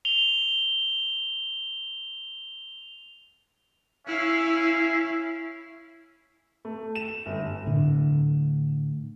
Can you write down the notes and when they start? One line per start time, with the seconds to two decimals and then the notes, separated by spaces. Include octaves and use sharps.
0.05 F7 G7
4.07 C#4 E4 E5 F5
6.65 A3
6.95 E7
7.26 G1
7.67 A2 D3